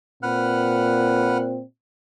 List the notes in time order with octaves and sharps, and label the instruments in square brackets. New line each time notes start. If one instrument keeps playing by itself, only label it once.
[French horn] A#2 [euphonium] C4 [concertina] B4 F#5 F6